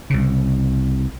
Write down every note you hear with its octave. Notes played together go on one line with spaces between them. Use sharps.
C2 C#3